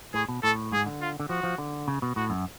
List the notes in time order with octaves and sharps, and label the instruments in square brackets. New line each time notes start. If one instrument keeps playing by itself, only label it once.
[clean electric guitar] A2 [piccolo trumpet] G#4
[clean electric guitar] B2
[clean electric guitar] A2 [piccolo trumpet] A4
[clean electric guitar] G#2 [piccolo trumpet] G#4
[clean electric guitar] D3
[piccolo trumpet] F4
[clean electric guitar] D3
[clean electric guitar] F3 [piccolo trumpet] F#4
[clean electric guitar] F3
D3
C#3
B2
[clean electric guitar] A2 [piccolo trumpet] F#4
[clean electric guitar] F#2